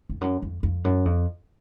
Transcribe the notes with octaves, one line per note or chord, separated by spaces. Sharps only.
F2
F#2
F2
F2
F#2
F2